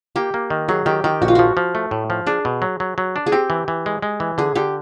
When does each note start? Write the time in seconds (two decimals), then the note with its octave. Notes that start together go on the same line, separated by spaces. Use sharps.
0.16 A#3 G4
0.34 A#3
0.50 D#3
0.68 F#3 G#4
0.86 D#3 G4
1.04 D#3 G4
1.22 A#1 F#4
1.28 F4
1.35 F3 F#4
1.57 F3
1.75 A3
1.91 A2
2.10 F3
2.26 D4 G#4
2.45 B2
2.62 F#3
2.80 F#3
2.98 F#3
3.16 D4
3.26 G#4
3.32 C4 G4
3.50 E3
3.68 E3
3.86 G#3
4.02 G#3
4.20 E3
4.38 D3 G#4
4.55 D3 G4